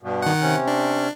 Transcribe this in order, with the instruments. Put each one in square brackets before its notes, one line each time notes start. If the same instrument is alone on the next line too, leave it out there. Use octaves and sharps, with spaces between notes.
[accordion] G2 B2
[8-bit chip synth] D#3 F#5
[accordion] C3 C#4
[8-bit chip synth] D4